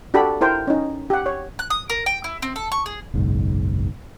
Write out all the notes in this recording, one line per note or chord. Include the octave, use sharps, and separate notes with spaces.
D4 F#4 G4 A4 B5
E4 A#4 C5 G5
C#4 D#4
G4 F#5
C#5
F#6
D#6
A#4
G5
E4
C4
A4
C#6
G#4
F#1 B1 G#2